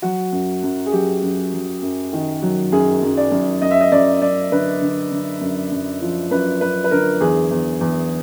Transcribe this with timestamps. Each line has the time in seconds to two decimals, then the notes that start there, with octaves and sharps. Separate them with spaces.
0.02 F#3 F#4
0.32 F#2
0.63 F#2
0.86 G#4
0.92 F#3 G4
1.23 F#2
1.53 F#3
1.82 F#2
2.13 D#3
2.42 F#3
2.72 F#2 G#4
3.03 F#2
3.17 D5
3.31 F#2
3.62 F#2 D#5
3.71 E5
3.81 D#5
3.92 F#2 D5
4.22 F#2 D5
4.51 D3 B4
4.81 D3
5.12 D3
5.41 F#2
5.72 F#2
6.01 F3
6.31 F#2 B4
6.61 F#2 B4
6.84 B4
6.91 D3 A#4
7.20 E2 G#4
7.51 E2
7.81 E2